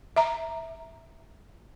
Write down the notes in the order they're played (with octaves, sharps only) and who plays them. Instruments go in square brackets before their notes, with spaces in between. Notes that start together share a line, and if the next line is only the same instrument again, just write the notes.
[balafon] E5 A#5